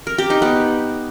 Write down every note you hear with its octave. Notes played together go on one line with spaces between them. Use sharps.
A#4
G4
D#4
B3